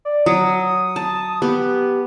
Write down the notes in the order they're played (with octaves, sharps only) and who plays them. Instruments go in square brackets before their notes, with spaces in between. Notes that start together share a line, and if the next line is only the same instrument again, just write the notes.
[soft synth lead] D5
[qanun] F#3 [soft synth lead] D#6
[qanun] A5
[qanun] B3 [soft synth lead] G4